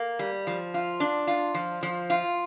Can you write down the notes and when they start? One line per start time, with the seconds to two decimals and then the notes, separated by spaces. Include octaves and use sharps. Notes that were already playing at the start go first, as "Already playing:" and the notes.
Already playing: A#3
0.19 G3
0.47 F3
0.74 F4
1.00 D4
1.27 F4
1.54 F3
1.83 F3
2.10 F4